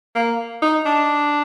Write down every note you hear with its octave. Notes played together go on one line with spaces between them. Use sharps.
A#3
D#4
D4